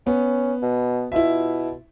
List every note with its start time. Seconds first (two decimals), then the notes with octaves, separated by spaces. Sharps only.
0.07 B3 C#4
0.62 B2
1.12 B2 E4 F4 E5